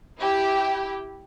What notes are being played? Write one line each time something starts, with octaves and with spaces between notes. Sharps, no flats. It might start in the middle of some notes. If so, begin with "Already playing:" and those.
E4 G4